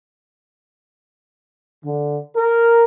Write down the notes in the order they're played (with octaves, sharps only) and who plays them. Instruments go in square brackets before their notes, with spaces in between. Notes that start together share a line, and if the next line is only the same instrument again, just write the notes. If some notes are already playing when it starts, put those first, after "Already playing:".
[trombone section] D3
A#4